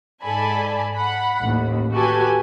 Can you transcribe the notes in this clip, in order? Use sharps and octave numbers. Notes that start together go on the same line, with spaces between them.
G#2 A4 D5 G#5 A5 B5
F#5 B5
A1 D#2
F#4 G4 A4 B4 G#5